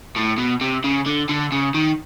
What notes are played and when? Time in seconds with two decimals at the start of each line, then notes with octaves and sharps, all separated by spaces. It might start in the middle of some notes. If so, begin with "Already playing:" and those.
0.16 A2
0.38 B2
0.61 C3
0.84 C#3
1.06 D3
1.29 D3
1.52 C#3
1.74 D#3